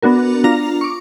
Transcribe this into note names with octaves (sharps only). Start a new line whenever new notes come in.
B3 D4 F#4 A#4
D4 F4 A#5 A#6 F7
C#6 D6